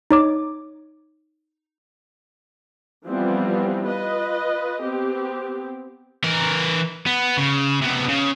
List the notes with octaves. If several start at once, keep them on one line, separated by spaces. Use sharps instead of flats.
D#4 C#5 D6
E3 F3 G3 B3 C4 F4
F4 B4 D#5
B3 C4 G4
E3 A#4
B3
C#3
C3 B3
C#3